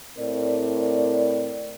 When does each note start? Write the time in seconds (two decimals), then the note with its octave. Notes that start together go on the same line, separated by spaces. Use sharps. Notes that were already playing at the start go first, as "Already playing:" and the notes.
0.18 A2 C4 A#4 D5